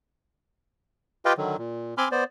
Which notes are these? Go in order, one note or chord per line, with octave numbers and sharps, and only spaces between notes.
F4 G4 B4 D#5 F5 G5
D3 D#3 F#3
A#2
C4 G#5 B5 C6 D6 F6
B3 C5 D5